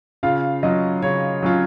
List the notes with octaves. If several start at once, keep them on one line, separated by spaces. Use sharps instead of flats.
C#3 F4 F5
F#3 C#4 F4 D#5
C#3 C#5
F#3 C#4 F4